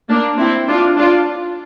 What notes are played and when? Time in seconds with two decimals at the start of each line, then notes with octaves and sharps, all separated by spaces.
0.09 A#3 D4
0.39 C4 E4
0.68 D4 F4
0.97 D4 F4